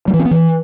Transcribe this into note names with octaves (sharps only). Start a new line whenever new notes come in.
G3
E3
C4
B3
E3